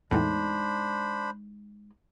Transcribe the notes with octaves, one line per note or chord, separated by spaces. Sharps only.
E2 A2 G#3 D4 D#4 C5 B5